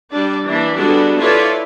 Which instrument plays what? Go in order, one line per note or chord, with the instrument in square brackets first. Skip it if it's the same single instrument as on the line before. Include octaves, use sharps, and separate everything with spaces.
[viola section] G3 D4 D5
E3 A#3 D4
G3 G#3 B3 D4 F#4 A4
E4 F4 A4 B4 C#5 D5